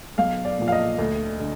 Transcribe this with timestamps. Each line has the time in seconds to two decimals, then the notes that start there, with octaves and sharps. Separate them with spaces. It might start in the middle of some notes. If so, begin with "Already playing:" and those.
0.18 B1 F5
0.45 D5
0.59 A#2 F3
0.68 F5
0.72 D#5
0.99 D2
1.40 D3